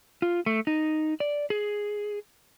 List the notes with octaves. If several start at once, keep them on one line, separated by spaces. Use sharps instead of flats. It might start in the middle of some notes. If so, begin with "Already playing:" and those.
F4
A3
D#4
D5
G#4